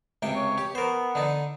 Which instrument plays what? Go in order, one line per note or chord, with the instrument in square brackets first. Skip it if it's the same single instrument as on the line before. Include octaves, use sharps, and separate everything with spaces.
[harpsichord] C#2 C3 G5
[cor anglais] C#5
[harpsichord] G4
[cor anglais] B3 [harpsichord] A#4 C5
[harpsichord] D3 D#4